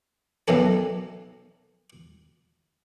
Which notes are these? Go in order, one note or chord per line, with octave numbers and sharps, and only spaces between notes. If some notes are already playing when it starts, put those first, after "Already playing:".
B1 F#2 B2 F#3 A4